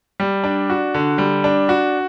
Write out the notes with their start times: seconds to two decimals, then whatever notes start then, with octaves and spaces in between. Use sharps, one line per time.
0.20 G3
0.44 D4
0.70 F#4
0.94 D3
1.18 G3
1.44 D4
1.69 F#4